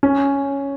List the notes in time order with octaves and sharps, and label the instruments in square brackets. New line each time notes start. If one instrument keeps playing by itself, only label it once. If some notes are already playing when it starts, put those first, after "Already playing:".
[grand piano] C#4